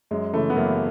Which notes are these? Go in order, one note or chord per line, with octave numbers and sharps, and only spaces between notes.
F#2 G#3
C#3 E3 A3
B3
F#2 A#3